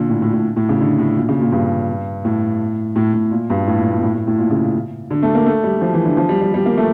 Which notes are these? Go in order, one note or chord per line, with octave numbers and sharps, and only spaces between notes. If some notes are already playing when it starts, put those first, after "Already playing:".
Already playing: A#2 D3
A2
A2
A2
A2
C#3
D3
A2
A#2
C#3
A#2
G2
A2
A2
A2
A#2
G2
A2
A#2
A2
A2
A2
A2
A#2
C#3
D3
A3
A#3
A3
G3
F3
E3
D3
F3
G3
G3
G3
A#3
A3